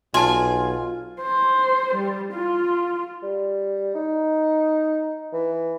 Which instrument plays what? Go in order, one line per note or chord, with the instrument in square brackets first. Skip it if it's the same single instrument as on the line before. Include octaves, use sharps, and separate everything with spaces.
[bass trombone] B1 [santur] F4 [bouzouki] G#5 [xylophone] A5 C6
[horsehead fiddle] C5
G3
F4
[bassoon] G3
D#4
E3